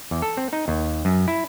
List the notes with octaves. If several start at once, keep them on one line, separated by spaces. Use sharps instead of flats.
E2
A4
C4
D#4
D#2
F#2
E4